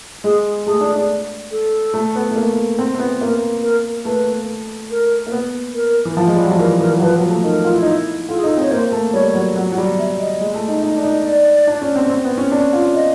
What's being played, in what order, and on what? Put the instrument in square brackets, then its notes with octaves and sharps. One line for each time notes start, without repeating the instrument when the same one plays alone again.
[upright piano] G#3 [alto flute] G#4
[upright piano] A3 [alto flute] G#4
[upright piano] D4
D4
[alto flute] A4
[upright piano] A3
B3
A3
A#3
C4
C4
B3
[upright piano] A#3 [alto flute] A#4
[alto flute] A#4
[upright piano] A3 [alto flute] B4
[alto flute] A#4
[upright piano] A#3
B3
[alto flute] A#4
[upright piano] E3
F3
G#3
G3
F#3
F3
[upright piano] E3 [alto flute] A#4
[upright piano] E3 [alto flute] A#4
[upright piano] F#3
[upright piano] F3 [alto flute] B4
[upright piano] F#3
A3
[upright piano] D#4 [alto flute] A#4
[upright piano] F4
E4
D#4
E4
[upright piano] F4 [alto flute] A4
[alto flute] G#4
[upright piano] D#4 [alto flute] A4
[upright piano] C4 [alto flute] C#5
[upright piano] A#3 [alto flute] C5
[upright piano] A3
[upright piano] G3 [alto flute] C#5
[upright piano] F#3
F#3
F#3
G3
[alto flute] E5
D#5
[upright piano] G#3
A3
D#4
D#4
D4
D#4
[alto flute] D5
[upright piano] D4
C#4
C4
C4
B3
C#4
D4
F4
[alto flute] D#5